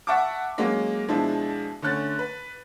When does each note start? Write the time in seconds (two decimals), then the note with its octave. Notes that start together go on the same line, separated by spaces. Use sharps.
0.07 E5 F#5 A5 C#6 D6
0.58 F#3 G#3 A#3 C#4
1.08 B2 F3 G#3 D4 E4
1.82 D3 A3 C#4 F#6 A6
2.19 B4